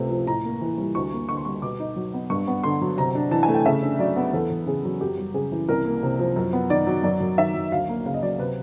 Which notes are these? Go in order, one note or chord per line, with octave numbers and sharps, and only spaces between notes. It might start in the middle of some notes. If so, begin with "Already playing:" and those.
Already playing: C#2 C3 A3
F3
A2 A#5
A#3
E3
G3
D2 C#6
A#3
D3 C#6
C6
G3 C#6
B2 D6
D#4
F#3
B3
G2 C#6
B3
D3 C6
F#3
C3 A#5
D4
E3 A5
G#5
A3
G5
C#3 E5
D4
F#3 D5
B3
E2 A4
E2
C#3 G#4
F#3
F#2 G4
G3
C#3 G#4
E3
C2 A#4
A#3
C3
F3
F#2
B3
D#3 D5
F#3
F#2 D5
F#2
D#3 E5
F#3
D2 F5
A#3
C#3 F5
D#5
F#3 D5
C3 B4